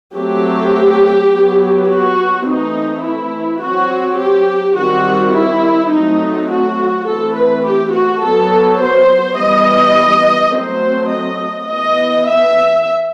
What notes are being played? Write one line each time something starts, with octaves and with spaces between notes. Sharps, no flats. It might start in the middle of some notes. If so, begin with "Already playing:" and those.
F#3 A3 C4 G4
F#3 B3
F#4
E3 A3 C4 D#4
E4
F#3 C4 F#4
G4
D#3 G3 C4 F#4
E4
F#3 A3 C4 D#4
F#4
E3 A3 C4 A4
B4
G4
F#4
F#3 B3 A4
C5
E3 G3 B3 D#5
F#3 A3 C4 C5
D#5
E3 B3 D#5
E5